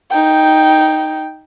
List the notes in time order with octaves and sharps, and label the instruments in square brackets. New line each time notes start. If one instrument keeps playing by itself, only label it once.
[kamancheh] D#4 G5